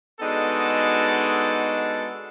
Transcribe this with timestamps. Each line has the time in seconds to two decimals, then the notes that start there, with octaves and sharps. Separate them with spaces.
0.20 G#3 B3 D4 D#4 F#4 A4